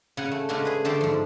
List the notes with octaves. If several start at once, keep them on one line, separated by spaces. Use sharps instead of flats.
C#3 F#5 G#5
A3
C#3 G#3 A3 C#4 D4 F#4
G#4 B4
D3 A3 G4 A4 C5
G#2 F3